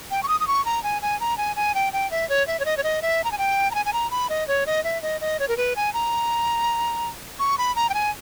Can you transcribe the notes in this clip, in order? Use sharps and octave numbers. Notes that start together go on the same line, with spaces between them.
G5
C#6
D#6
D#6
C#6
A#5
G#5
G#5
A#5
G#5
G#5
G5
G5
E5
C#5
E5
C#5
D#5
C#5
D#5
E5
A#5
G#5
G5
A#5
G#5
G#5
A#5
B5
D#5
C#5
D#5
E5
D#5
D#5
C#5
A#4
B4
G#5
A#5
C#6
B5
A#5
G5
G#5